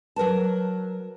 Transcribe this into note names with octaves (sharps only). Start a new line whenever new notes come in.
F#3 A#4 B4 A5